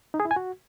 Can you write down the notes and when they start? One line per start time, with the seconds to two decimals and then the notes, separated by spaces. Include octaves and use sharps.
0.14 D#4
0.20 G#4
0.25 E4
0.31 G#5
0.36 F#4